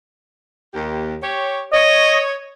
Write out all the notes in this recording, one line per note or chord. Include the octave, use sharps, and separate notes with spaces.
D#2 G4
G4 C#5
C#5 D#5